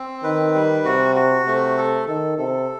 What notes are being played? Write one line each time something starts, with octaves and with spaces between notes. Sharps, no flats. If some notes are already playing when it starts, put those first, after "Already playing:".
Already playing: C4
D#3 B4
G3
C3 F#4
F#4
C3 A3
A4
D#3 A4
C3 A4